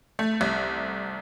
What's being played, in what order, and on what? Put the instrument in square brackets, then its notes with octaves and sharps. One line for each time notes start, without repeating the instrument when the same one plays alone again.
[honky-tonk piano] A3
C2